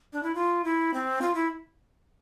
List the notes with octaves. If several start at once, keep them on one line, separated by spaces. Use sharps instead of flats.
D4
E4
F4
E4
C4
F4
E4